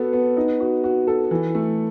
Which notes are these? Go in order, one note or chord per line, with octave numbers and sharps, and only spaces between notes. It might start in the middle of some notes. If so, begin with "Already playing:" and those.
Already playing: B3 F#4 A4
B3
D#4
F#4
F#4
A4
E3
A3